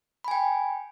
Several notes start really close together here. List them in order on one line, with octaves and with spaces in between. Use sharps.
B5 G#5 G5